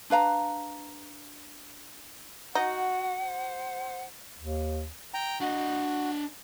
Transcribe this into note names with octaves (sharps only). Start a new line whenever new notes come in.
D4 B4 F5 A#5
D#4 F#4 F#5
C5
D#2
G5 A#5
D4 F#4 D#5